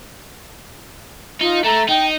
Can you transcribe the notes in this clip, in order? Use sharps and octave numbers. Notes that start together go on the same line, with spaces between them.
D#4 F4
A3 A#5
D#4 G5